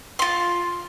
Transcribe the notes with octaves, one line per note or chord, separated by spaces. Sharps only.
F4 C6